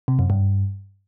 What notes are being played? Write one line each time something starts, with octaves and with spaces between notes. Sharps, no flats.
C3
F#2
G2